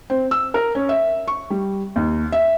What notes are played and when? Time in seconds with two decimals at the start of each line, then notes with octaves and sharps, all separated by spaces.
0.10 C4
0.31 E6
0.54 A#4
0.75 C#4
0.89 E5
1.28 C#6
1.50 G3
1.96 D#2
2.32 E5